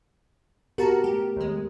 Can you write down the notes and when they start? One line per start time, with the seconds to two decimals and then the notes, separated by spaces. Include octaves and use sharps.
0.78 B3 F#4 G4 A#4 A5 A#5
1.04 A3 G4
1.36 D#2 G#3